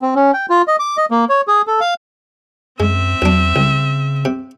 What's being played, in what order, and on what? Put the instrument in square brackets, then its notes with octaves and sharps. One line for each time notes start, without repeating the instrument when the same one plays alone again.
[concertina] C4
C#4
G5
F4
D#5
D6
D#5
A#3
C#5
G#4
A4
F5
[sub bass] F#2 [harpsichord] G#3 [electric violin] C4 E5
[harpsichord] B1 D4 [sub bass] E2
[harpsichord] C2 [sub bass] C#3
[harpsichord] C3